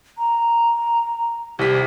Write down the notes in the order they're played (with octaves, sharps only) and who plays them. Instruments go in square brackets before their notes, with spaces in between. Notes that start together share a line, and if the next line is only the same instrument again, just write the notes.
[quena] A#5
[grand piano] C2 B6 [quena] G4